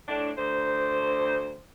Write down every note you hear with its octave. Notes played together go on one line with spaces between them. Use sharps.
A2 D4
D2 C5